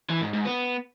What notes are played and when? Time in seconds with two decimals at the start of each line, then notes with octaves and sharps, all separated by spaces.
0.10 E3
0.22 G#2
0.33 G#2
0.45 B3